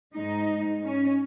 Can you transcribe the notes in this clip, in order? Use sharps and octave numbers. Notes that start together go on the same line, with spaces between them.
G#2 G#3 D#4
C#4